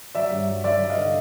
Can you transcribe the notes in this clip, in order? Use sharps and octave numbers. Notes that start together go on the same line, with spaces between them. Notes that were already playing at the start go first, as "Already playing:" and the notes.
F#3 D5 E5
G2
F#3
F#3 D5 E5
F#3
D#5 F5
D3